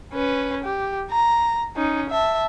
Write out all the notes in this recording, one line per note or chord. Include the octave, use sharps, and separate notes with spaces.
C#4 B4
G4
A#5
C#4 D#4
E5 A5